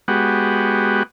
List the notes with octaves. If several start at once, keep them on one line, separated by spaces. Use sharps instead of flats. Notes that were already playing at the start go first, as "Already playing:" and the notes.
G#3 B3 F#4 G4